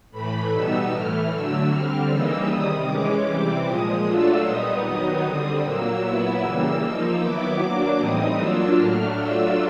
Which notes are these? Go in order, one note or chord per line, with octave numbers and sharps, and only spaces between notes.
A2 E3 A3 B5
B2 G3 B3 D#4 E6
A2 E3 A3 F6
D3 F#3 A3 E6
D3 G3 C4 F6
C#3 E3 G3 A#3 D#4 E6
C3 D#3 G3 D#6
E3 G#3 C#4 D6
C3 E3 G3 C4 D6
A#2 F3 G#3 D#6
F#3 A3 D4 F4 E6
A#2 G3 B3 D#4 D#6
D#3 F#3 B3 D#4
D3 G3 C4
A#2 F#3 A#3 E6
A#2 F#3 B3 E4
C#3 E3 G3 A#3
F3 A#3 D#4
D#3 F#3 B3 E4 D6
F#3 A#3 D4 D6
A2 E3 G3 C4 D#4 D#6
F#3 A#3 D4 F4 E6
A2 F#3 A3 D4 F6
F#3 A3 D4 F4 E6